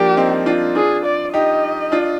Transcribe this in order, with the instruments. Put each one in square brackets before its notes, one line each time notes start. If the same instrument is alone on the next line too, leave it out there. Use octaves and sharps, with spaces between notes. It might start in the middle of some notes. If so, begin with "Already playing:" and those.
Already playing: [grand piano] F3 A#3 D4 [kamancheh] G4
[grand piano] C4 D#4
D4 F4
[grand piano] D4 F4 [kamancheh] G#4
[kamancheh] D5
[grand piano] D#4 G4 [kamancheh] D#5
[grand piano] D4 F4